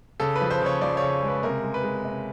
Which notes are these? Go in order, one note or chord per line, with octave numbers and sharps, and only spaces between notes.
C#3 A4
B4
F3
C5
C#3 C#5
F3 D5
C#5
C#3
G#3
B4
C3 A#4
G#3
B4
G#3
C3